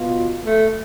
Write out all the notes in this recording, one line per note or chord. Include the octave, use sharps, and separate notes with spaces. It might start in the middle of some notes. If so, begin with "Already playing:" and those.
Already playing: B2 B3 F4
A3